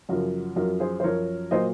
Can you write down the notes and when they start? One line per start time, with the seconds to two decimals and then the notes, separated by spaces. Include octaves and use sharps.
0.09 F#2 C#3 F3 F#4 A#4
0.56 F#2 F3 F#4 A#4
0.80 G#4 C5
1.00 C5
1.04 F#2 F3 A#4 C#5
1.51 A#2 F#3 C5 D#5